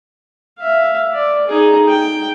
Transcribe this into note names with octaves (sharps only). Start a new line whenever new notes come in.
E5 F5
D5
D#4 G#4
G5